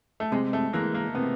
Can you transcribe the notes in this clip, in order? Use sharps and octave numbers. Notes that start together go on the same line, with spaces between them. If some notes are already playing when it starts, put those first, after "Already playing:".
A3
C3 G#3
A3
E3 G#3 A#3
A#3
C3 B3